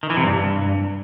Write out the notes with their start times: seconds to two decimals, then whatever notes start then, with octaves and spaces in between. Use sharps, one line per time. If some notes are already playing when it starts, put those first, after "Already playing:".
0.03 D#3
0.10 E3
0.17 C3
0.24 G2